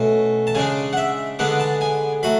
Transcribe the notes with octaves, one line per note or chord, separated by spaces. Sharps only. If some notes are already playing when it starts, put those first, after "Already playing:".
Already playing: B2 A3 C#4
A5
C#3 G#3 D4 G#5
F#5
E5
D3 G#3 B3 D4 F#5
A5
G#5
F#3 A3 B5